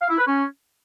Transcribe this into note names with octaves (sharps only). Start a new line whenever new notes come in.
F5
E4
B4
C#4